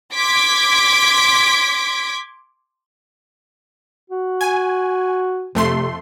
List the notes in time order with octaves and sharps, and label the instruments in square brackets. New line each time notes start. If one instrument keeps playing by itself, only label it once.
[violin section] C6 D6 G#6 B6 D7
[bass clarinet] F#4
[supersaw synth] G#5
[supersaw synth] F2 A3 C6 [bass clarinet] C3